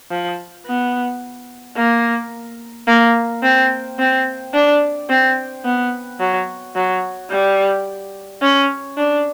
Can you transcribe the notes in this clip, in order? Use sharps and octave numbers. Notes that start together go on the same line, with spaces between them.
F3
B3
A#3
A#3
C4
C4
D4
C4
B3
F#3
F#3
G3
C#4
D4